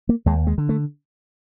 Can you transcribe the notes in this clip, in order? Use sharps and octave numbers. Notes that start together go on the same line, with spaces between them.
A#3
D#2 G#3
G#3
D3
A3